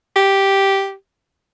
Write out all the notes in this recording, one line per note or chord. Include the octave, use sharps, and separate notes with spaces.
G4